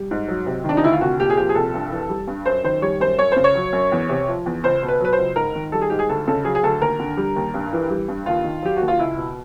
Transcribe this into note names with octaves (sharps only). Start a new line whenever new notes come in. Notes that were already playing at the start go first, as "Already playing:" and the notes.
Already playing: G3
G#2
F#3
C3
D#3 D4
D#4
D2 E4
F4
C2 F#4
A#2 G4
G#4
F3 G4
G#4
C2 A4
G2
E3
G3
G2
F#2 C5
D#3 C5
G3 C#5
F#2 C5
F#2 C#5
C#3 C5
C#5
F#3
F#2
E2
C3
F3
E2
C#2 C5
B2
B4
F#3 B4
C5
C#2
G#2 A#4
D#3
G3 A4
G#4
G#2 G4
G#4
D2 A4
C#3 A4
F#3 G#4
G#4
D2 A4
D#2 A#4
D3
G3
D#2
G2
E3
G3
G2
D#2 F4
D#3
F#3 G4
D#2 F#4
F4
C#2 E4
B2